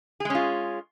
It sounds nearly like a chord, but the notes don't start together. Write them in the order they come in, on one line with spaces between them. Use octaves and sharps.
G#4 G#3 C#4 F4